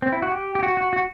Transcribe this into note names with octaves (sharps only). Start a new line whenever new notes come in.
C4
E4
F#4
G4
G4
F#4
F#4
F#4